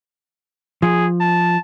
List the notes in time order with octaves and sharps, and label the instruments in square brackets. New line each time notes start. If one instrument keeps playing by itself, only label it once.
[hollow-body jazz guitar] F3 [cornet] G#4
[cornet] A5